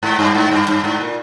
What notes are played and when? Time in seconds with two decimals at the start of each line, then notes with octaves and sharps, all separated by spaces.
0.03 G#2
0.19 G2
0.35 G#2
0.51 G2
0.68 G2
0.84 G#2
1.01 A#2